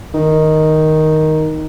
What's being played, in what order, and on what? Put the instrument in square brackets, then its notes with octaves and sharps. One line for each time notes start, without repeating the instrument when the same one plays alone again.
[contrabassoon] D#3